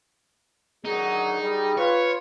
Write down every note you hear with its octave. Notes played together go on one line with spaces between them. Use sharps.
D3 D#3 F#3 D#4 G#4
G3 G#4
F4 B4 C#5